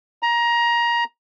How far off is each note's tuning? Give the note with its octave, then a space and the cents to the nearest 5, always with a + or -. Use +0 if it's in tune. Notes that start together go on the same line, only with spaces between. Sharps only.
A#5 +20